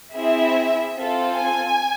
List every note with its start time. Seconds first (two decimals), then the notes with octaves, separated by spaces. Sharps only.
0.15 C4 E4 G#4 E5
0.95 C4 F4 A4
1.36 G#5